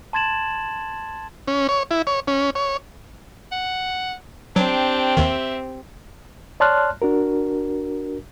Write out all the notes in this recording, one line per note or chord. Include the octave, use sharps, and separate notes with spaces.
A5 C6 G#6 A6 E7 F#7
C#4
C#5
E4
C#5
C#4
C#5
F#5
F#3 C4 D4 G4
D#2 D#3 E5
C#5 D5 A5 C6 F6 F#6
D4 F#4 A#4